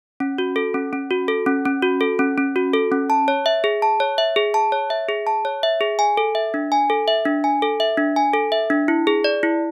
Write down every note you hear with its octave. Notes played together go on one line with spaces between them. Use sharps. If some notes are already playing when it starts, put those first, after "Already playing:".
C#4
F#4
A4
C#4
C#4
F#4
A4
C#4
C#4
F#4
A4
C#4
C#4
F#4
A4
C#4
A5
C#5
E5
G#4
A5
C#5
E5
G#4
A5
C#5
E5
G#4
A5
C#5
E5
G#4
G#5
A4
E5
D4
G#5
A4
E5
D4
G#5
A4
E5
D4
G#5
A4
E5
D4
E4
G#4
D5
E4